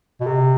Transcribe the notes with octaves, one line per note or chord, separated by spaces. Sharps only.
B2
C3